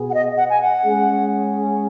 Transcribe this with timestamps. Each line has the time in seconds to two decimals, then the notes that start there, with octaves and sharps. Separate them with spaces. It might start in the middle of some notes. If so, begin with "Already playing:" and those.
Already playing: B2 B3 G#4
0.10 F#5
0.14 D#5
0.37 F#5
0.50 G#5
0.62 F#5
0.85 G#3 C#4 G#4